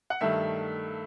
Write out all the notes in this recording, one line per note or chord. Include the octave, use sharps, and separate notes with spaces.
F#5
G2 D#3 A3 E5